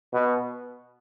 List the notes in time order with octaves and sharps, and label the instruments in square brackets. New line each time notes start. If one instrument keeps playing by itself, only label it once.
[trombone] B2